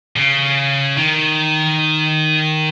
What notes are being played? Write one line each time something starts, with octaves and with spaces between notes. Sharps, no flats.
C#3
D#3